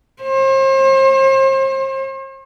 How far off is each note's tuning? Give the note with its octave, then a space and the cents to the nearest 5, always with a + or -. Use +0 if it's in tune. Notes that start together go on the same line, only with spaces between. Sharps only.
C5 +40